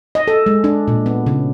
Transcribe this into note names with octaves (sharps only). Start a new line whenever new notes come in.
D#5
A4
G#3
D4
A#2
B3
C#3